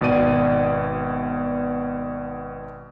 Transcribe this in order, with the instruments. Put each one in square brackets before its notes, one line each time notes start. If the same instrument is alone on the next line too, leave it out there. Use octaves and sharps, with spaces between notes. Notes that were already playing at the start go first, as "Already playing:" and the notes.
[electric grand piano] G#1 B2 D5 D#7